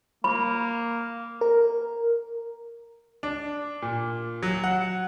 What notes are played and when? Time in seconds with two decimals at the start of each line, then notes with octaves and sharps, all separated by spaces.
0.24 A#3 B5
1.41 A#4
3.23 D4
3.82 A#2
4.43 F#3
4.64 F#5